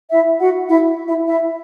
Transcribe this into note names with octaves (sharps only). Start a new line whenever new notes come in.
E4 E5
F#4 F#5
E4 E5
E4 E5
E4 E5